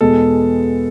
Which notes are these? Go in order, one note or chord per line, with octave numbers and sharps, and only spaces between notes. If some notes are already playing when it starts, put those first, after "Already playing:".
E2 B2 G#3 B3 A4